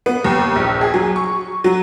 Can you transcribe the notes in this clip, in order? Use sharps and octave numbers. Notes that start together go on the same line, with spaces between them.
B3
D#2
A#1
G#4
F#3
C#6
F#3